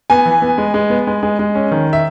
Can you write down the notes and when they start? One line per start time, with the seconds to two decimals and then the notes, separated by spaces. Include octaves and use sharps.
0.10 B3 G#5
0.26 E3
0.42 B3
0.58 G#3
0.74 G#3
0.90 B3
1.07 G#3
1.23 G#3
1.39 G#3
1.55 C#4
1.72 D#3
1.93 E5